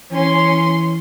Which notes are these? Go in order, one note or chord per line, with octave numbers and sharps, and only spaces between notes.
E3 C#4 C6